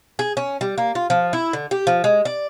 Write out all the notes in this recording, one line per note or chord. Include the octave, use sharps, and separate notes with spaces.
G#4
C#4
G3
A#3
F4
F3
E4
D3
G4
F3
G#3
D5